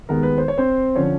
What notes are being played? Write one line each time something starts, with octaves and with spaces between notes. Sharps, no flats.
D#2 D#3 G#3 B3 A#4
B4
C5
C#5
C4 C5
D3 F3 C#4 C#5